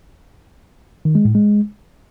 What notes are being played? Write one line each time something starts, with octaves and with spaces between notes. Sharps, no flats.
D#3
G#3
A2
G#3